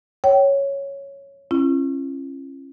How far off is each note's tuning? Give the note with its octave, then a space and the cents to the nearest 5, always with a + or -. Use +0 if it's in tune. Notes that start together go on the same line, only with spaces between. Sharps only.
C#5 +0 G5 -30
C#4 -30 E4 +45